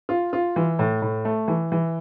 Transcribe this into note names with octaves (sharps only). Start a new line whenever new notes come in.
F4
F4
E3
A2
A2
A3
E3
E3